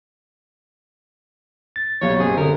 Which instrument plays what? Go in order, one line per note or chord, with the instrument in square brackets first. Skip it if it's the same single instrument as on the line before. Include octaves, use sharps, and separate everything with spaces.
[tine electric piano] A6
[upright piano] B1 F#3 G3 [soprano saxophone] C#5
[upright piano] F#1 C4 G4 [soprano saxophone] G#4
[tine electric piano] D3 [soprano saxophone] A#4